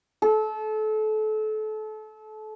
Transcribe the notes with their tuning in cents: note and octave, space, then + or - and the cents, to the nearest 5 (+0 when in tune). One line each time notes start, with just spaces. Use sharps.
A4 -30